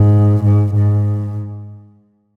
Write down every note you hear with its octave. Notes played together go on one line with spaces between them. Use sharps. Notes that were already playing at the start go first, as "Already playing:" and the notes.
Already playing: G#2
G#2
G#2